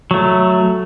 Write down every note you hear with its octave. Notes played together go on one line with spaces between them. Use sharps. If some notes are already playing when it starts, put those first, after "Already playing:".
F#3 A3